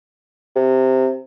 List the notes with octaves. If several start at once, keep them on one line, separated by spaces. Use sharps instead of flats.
C3